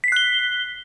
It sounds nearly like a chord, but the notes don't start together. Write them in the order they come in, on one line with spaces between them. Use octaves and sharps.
B6 C7 F#6 G7